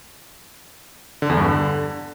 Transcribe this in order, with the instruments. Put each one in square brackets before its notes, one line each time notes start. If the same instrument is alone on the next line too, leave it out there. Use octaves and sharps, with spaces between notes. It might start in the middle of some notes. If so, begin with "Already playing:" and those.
[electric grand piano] D3
E2
G2
D3